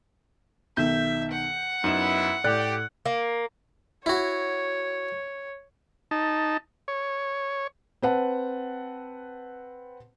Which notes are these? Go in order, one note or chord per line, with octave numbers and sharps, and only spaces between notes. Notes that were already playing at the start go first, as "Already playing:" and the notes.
B1 D#3 E5 G6
F#5
F#2 B3 D#4 E4 E7
A2 G4 D5 F#6
A#3
E4 F#4 C#5
D#4 A5
C#5
C4 B4 F#5 A5